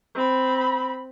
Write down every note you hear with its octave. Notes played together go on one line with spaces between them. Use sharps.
C4 B5